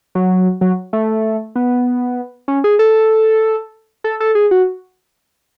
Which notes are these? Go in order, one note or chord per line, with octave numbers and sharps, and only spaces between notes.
F#3
F#3
A3
B3
C#4
G#4
A4
A4
A4
G#4
F#4